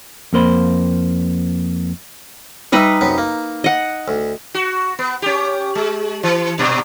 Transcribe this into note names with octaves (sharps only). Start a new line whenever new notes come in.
F2 A#3 C5 B5
G3 D#4 B4 D#5 E5
F#2 C3 B3
A#3
D#5 F#5
D2
F#4
B3
C#4 G4
G#3
E3
G2 A#2